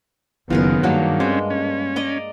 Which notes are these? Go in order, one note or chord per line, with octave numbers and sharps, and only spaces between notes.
F#1 D#3 B3 F4 G#4 A#4
G2 F#3 A#3 D4
G#3 C4 C#4
C#4
D5 D#5 A#5